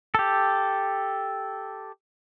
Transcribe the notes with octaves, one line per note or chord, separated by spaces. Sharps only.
G4 A4